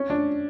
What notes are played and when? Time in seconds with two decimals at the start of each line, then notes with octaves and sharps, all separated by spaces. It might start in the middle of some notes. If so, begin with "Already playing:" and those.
Already playing: C#4
0.10 D4